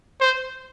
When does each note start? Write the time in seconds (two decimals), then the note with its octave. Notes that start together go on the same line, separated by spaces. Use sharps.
0.21 C5